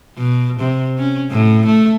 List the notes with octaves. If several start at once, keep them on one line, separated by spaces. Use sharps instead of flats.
B2
C3
C#4
A2
A3